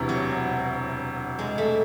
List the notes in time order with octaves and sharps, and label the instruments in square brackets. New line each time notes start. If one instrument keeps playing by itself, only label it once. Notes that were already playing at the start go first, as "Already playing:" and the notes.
Already playing: [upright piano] E1 D2 C3 E3
[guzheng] F#3
G#3
A3